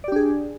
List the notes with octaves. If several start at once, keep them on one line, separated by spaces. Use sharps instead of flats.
D4 G4 G#4 D5